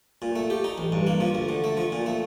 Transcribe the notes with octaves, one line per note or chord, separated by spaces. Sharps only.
A#2
A3
G4
D#4
A1
G2
A#3
F3
D2
D3
A3
F3
A#2
A3